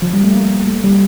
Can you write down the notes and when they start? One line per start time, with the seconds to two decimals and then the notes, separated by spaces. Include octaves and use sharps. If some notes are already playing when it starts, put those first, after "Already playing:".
0.02 F3
0.13 G3
0.24 A3
0.34 A#3
0.67 A3
0.84 G3